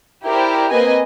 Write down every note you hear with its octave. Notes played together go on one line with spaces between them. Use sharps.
E4 G4 A#4 C5 D5
A#3 C4 B4 D#5 G#5